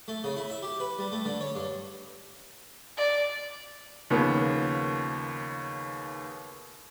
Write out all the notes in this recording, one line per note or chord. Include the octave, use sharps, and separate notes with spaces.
A3
C#3
E4
E5
G4
B4
G3
A3
D3
C#5
G2
D5
D#2 C#3 F3 A#3 B3